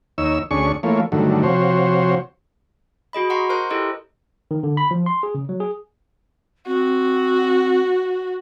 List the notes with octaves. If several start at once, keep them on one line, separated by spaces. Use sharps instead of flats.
D#2 D#4 C#5 E6
D2 C#4 D4 G#4 C#6
E3 A3 A#3 F4 C#5
G2 D3 D#3 F#3 A3
C3 F3 F#4 C5 C#5
F#4 G#4 D#5 B5
D#5 F#5 A#5 C6 C#6 C7
A#4 C5 A#5 C6 F#6
E4 G4 A4 D#5
D#3
D3
B5
F3
C6
G#4
C#3
F#3
G#4
C4 F#4